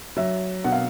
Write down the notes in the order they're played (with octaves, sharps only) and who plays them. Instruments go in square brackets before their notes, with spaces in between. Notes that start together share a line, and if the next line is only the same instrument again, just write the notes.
[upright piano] F#3 E5
B2 F#5
F5